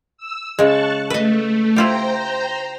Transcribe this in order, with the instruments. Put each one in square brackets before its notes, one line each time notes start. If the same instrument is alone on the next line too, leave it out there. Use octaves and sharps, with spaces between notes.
[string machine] E6
[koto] C#3 G#3 [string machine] A5 C#6 F#6
[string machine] A3 [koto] B4 D#5
[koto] E4 F4 G4 [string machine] C5 G5 A#5